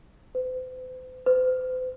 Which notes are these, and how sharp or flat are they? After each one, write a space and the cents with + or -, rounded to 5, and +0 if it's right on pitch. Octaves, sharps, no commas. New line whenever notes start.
C5 -45
C5 -45